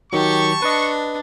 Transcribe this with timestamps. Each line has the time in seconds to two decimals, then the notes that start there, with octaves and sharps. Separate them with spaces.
0.13 D#3 F#3 G4 A5 C#6
0.62 D4 B4 D#5